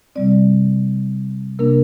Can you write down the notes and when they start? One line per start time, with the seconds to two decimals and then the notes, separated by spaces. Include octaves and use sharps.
0.15 C3 G3 C4 D5
1.59 C3 A#3 D4 A#4